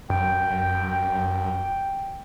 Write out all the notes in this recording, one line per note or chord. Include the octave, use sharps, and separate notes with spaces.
F#2 G5